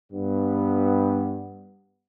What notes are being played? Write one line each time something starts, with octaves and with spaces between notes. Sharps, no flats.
G2 B3